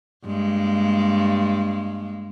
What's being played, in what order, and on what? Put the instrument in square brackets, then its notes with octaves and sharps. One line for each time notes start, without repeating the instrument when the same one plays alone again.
[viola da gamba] G2 G#3 A#3